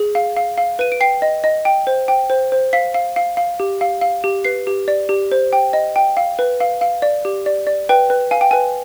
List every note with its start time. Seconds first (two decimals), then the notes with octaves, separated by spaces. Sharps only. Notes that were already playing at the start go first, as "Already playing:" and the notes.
Already playing: G#4
0.15 F5
0.37 F5
0.58 F5
0.79 B4 D#7
0.92 D7
1.01 G5 C7
1.22 D#5
1.44 D#5
1.65 G5
1.87 C5
2.08 G5
2.30 C5
2.52 C5
2.73 F5 B6
2.94 F5
3.16 F5
3.37 F5
3.60 G4
3.81 F5
4.01 F5
4.24 G4
4.44 B4 C7
4.67 G4
4.88 D5
5.09 G4
5.32 C5
5.53 G5
5.73 D#5
5.96 G5
6.17 F5
6.39 B4
6.60 F5
6.81 F5
7.02 D5
7.25 G4
7.46 D5
7.67 D5
7.89 B4 G5
8.10 B4
8.31 F5 G#5
8.41 G5
8.51 B4 G#5